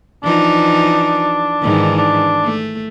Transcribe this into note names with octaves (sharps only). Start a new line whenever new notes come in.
E3 F3 D4 D#4
G#2 D#3 E3
D4
A3